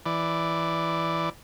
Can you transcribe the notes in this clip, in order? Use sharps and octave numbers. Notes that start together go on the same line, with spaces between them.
E3 D5